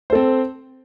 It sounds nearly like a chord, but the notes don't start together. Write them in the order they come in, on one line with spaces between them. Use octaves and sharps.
C5 A4 C4